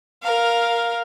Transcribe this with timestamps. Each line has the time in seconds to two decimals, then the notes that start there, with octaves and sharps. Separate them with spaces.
0.22 A#4 F5